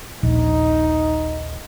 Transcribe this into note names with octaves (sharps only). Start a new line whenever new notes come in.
D#1 A#1 D#4